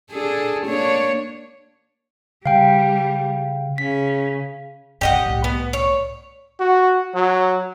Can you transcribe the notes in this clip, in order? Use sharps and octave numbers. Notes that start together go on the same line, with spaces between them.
D4 G#4 A4
A#3 D4 C#5
C#3 G3 F5 G5
C#3 C#4 B6
G2 C3 G4 D#5 F#5
C2 A2
B3
C#5
F#4
F#3